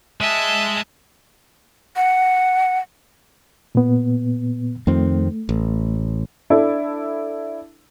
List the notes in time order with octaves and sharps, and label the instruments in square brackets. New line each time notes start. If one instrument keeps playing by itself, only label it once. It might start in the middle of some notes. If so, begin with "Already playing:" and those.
[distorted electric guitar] G#3 D#5 [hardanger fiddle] E5 A5
[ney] F#5
[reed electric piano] A#2 B3
[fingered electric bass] F2 D#3 C4 [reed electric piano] A3
[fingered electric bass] A1
[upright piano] D4 E4 A4